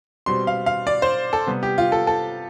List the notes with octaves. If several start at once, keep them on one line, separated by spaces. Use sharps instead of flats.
B2 G3 C4 C6
F5
F5
D5
C5
A4
C3 G3 B3
G4
F4
A4
A4